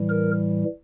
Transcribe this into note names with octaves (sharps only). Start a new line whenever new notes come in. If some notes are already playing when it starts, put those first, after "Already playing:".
Already playing: A2 E3 G3
A#4